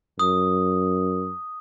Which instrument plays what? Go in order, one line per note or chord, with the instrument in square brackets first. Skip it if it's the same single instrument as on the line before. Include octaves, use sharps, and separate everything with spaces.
[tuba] F#2 [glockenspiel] D#6